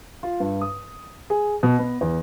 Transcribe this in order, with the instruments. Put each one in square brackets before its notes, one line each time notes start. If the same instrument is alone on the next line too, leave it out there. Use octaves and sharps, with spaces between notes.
[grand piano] F4
G2
D#6
G#4
B2
B3
E2